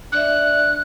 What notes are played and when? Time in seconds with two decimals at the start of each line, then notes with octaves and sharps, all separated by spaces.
0.12 D4 D5 E5 F#6